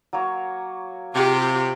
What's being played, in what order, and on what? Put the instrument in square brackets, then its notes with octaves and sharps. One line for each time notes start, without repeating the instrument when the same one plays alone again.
[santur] F#3 A#3 C#5
[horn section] C3 [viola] F4 G4